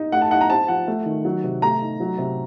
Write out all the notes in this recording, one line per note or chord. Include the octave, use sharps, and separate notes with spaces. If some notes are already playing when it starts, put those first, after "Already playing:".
Already playing: D#4
A3 F#5
A5
D#4 F#5
A#5
C4 A5
F3 F#5
A3
D#3
F#3
C3
A3 A#5
D#4
F#3
C3